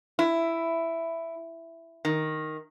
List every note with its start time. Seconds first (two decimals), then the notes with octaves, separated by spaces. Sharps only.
0.19 E4
2.05 D#3